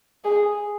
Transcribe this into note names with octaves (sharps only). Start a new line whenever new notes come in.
G#4